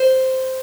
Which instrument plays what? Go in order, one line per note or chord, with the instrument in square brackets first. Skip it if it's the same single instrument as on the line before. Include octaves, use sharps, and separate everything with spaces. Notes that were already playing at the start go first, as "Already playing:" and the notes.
Already playing: [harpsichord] C5